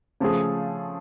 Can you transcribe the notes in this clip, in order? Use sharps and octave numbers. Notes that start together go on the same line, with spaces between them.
C#3 F3 A3 F4 G#4